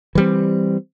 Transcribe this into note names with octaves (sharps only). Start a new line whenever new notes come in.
E3 G3 C4